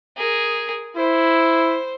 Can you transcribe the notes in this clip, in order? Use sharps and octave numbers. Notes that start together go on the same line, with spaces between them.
G#4 A#4
E4 C5